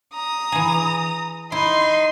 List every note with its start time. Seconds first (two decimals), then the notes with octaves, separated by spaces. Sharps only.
0.14 A#5 D#6
0.52 E3 G#4
1.52 D#4 E4 C6